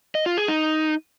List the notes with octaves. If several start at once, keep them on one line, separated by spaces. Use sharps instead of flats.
D#5
F4
G#4
D#4